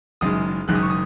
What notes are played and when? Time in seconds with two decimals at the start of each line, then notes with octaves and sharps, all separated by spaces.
0.21 F#1 F#2 D#3 G#3 D#6
0.68 F#1 F#2 D#3 G#3 F#6
0.75 D#6
0.83 C#6
0.90 D#6